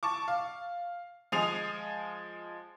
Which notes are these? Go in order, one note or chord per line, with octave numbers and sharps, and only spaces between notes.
A5 C#6 D6
F5
F3 G#3 G#5 D#6 C7 F7